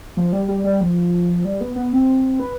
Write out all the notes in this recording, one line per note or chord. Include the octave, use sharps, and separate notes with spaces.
F3
G3
G3
G3
F3
G3
B3
B3
C4
B4